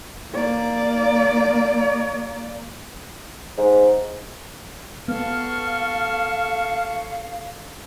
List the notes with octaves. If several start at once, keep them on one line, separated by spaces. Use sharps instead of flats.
A#3 D5
G#2
B3 A4 F5 C#6 F6